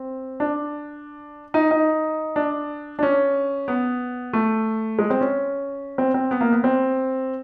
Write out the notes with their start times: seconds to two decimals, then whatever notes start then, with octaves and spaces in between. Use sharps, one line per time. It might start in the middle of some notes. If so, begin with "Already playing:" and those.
Already playing: C4
0.40 D4
1.54 D#4
1.71 D#4
2.36 D4
2.99 D4
3.03 C#4
3.68 B3
4.33 A3
4.99 G#3
5.10 C4
5.21 C#4
5.98 C4
6.14 C4
6.31 B3
6.41 A#3
6.52 B3
6.64 C4